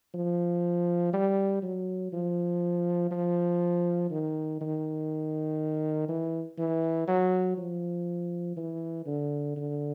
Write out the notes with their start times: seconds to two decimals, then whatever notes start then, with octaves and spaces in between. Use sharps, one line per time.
0.14 F3
1.13 G3
1.62 F#3
2.12 F3
3.11 F3
4.10 D#3
4.61 D#3
6.08 E3
6.58 E3
7.07 F#3
7.57 F3
8.56 E3
9.06 D3
9.56 D3